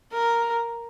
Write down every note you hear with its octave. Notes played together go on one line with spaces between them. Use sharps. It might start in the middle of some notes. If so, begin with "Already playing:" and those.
A#4